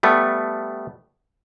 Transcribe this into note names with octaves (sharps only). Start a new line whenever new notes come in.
G3 A3 B3